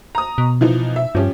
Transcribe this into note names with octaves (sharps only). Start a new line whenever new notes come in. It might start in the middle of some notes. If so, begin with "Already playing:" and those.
A#5 D#6
B2
E3 F3 D#4
E5
G2 F3 C#4 G4